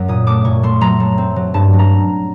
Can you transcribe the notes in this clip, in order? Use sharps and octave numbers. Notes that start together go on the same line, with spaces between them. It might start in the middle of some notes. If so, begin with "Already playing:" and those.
Already playing: F#2 F#3
A#2 D#6
A3 D6
A#2 C#6
A3 C6
F#3 A#5
A3
C4
F#3
G2 A5
F#3
A#5